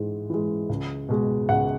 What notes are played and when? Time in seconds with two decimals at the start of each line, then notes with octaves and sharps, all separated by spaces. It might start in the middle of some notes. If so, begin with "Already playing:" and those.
Already playing: G#2 E3 G#3
0.30 E3 G#3
0.69 C#2
1.09 B2 G#3
1.49 C#2 F#5